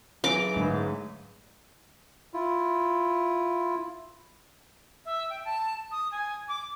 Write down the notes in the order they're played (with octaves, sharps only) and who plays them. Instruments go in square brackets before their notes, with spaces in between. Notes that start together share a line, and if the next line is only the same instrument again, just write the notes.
[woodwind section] C#3 E3 F#3 [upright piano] G#5 A#6 F7 [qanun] D6
[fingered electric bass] G#2 [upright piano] D3 A3 B4
[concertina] E4 F4
[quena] E5
G5
A5
D#6
G#5
D6